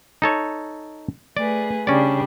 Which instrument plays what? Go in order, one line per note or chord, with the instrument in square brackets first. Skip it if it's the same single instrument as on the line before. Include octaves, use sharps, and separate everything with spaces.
[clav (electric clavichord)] D#4 A4 C#5
[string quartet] A3 G#4 B4 [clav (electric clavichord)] D5
[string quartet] C#3 G3 D4 [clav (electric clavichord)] C#4 D5